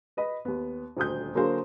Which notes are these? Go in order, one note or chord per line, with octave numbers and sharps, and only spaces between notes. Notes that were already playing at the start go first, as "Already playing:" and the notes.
B4 D#5 B5
D#2 B3
D#1 D2 D#6 G6
D3 F#3 A#3 G#4 A#4 C5